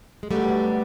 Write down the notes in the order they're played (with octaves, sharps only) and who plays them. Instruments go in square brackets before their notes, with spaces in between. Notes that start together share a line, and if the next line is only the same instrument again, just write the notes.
[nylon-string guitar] G#3
[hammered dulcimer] D3 F#3 B3 D4 [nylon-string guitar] G3 A3